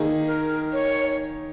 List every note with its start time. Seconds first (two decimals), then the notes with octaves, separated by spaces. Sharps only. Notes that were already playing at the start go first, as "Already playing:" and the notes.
Already playing: D#3 A#3 D#4 G#4
0.26 A#4
0.73 C#5